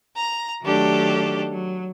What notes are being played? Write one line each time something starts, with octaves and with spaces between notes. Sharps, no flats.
A#5
D#3 F#3 A3 D4 G4 A4
F#3